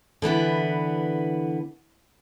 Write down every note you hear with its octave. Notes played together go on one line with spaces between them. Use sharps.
D3 E3 B3 B4